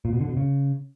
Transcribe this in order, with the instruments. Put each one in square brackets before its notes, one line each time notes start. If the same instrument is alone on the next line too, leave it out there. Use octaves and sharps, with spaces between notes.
[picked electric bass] A#2
B2
D3
B2
C#3